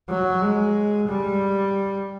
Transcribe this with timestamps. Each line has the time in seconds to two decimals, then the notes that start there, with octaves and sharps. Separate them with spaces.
0.09 F#3
0.41 G#3
1.07 G3